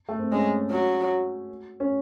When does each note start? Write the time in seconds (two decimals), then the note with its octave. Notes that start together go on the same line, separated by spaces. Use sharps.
0.09 A3
0.19 C4
0.32 G#3 C#4
0.71 F#3
1.80 C#4